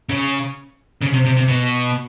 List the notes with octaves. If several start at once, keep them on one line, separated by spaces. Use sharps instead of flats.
C#3
C#3
C3
C3
C3
B2